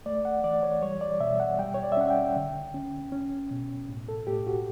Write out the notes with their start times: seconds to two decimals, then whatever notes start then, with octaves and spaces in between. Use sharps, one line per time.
0.06 A3 D5
0.25 F#5
0.44 E3 D5
0.63 C#5
0.82 G3 C#5
1.01 D5
1.20 B2 E5
1.40 F#5
1.59 G3 G5
1.74 C#5
1.83 D5
1.92 E5
1.97 C#4 F#5
2.10 G5
2.36 D3
2.74 C#4
3.12 C#4
3.50 B2
3.89 A2
4.09 A4
4.27 A2 G4
4.47 F#4